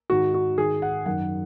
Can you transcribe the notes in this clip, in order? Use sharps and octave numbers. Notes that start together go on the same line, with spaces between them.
G#2 D#3 F#4
F#4
G#2 D#3 G#4
F#5
F#2 D#3 F#5